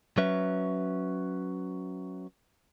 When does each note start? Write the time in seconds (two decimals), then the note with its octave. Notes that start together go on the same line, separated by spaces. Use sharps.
0.18 F#3 C#4 B4 E5